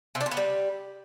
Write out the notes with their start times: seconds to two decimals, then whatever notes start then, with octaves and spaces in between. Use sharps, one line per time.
0.15 C3
0.21 D4
0.26 C3
0.31 B3
0.37 G3